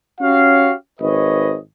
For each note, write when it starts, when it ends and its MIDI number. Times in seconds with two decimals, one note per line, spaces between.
0.21 0.73 61
0.21 0.73 66
0.21 0.73 67
0.21 0.73 73
0.21 0.73 77
1.01 1.56 32
1.01 1.56 71
1.01 1.56 73
1.01 1.56 75